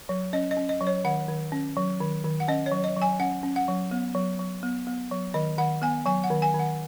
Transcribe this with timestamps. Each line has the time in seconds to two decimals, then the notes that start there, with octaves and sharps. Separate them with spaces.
0.09 F#3
0.33 C#4 D#5
0.51 D#5
0.57 C#4
0.69 D#5
0.81 F#3
0.87 C#5
1.05 D#3 F#5
1.28 D#3
1.52 C#4
1.77 F#3
2.00 D#3
2.24 D#3
2.40 F#5
2.48 C#4 D#5
2.66 C#5
2.71 F#3
2.84 D#5
2.96 F#3
3.02 G#5
3.20 C#4 F#5
3.43 C#4
3.56 F#5
3.68 F#3
3.91 B3
4.15 F#3
4.39 F#3
4.63 B3
4.87 B3
5.11 F#3
5.34 D#3 D#5
5.58 D#3 F#5
5.82 B3 G#5
6.06 F#3 G#5
6.24 F#5
6.30 D#3
6.42 G#5
6.54 D#3
6.59 F#5